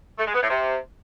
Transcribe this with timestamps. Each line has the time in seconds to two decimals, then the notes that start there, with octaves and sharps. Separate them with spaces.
0.19 A3
0.26 G#3
0.34 B3
0.41 A2
0.49 C3